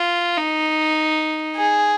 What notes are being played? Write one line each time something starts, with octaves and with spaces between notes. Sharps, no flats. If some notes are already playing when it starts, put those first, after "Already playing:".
Already playing: F4
D#4
G#4